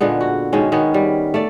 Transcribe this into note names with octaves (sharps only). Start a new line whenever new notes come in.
A#2 D3 G#3 B3
F#4
B2 D#3 G#3 C#4
D#3 B3 C#4
G3
A3 D5